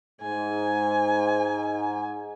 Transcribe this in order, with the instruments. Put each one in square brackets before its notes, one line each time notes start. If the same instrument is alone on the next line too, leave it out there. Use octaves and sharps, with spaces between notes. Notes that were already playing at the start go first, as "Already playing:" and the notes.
[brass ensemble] G#2 [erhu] G#5